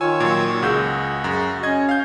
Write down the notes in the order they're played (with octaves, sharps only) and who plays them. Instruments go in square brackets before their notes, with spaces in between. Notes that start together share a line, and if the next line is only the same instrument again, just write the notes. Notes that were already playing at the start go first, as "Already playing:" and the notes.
[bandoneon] D#3 C#5 E6 [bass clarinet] F4 [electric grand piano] G#5
[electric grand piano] A#2 F#3
[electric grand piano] C#2 E6 G6 [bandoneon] F#4 [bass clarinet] G#4
[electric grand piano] F#2
[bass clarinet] C#4 [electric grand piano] D#5 G#6
[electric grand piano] F5 G6